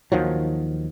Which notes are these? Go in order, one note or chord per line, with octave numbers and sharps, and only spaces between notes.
D#2 D#3 F3 F#3